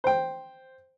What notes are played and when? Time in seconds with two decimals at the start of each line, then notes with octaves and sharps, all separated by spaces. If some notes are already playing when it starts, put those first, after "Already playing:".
0.04 C5 G5